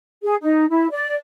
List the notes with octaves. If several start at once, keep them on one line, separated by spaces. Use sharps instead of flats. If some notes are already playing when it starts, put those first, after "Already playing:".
G#4
D#4
E4
D5